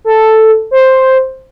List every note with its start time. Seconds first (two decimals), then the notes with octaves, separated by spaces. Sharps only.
0.05 A4
0.71 C5